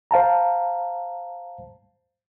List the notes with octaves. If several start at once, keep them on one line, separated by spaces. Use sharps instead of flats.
C5 F5 A5 A#5